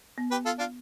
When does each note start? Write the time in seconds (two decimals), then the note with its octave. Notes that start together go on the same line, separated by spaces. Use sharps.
0.18 B3
0.31 G4 B4
0.45 F4 A4
0.59 D4 F4